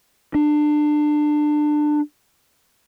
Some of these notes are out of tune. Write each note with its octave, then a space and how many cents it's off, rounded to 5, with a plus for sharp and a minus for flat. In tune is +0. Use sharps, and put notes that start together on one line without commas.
D4 +25